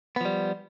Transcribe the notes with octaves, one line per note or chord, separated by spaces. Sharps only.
F3 G3 B3